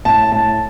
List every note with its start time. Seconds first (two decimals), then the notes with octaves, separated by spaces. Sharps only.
0.05 A2 A5
0.32 A2 A5